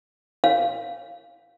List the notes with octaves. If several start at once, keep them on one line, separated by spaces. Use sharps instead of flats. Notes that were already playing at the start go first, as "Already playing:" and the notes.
F5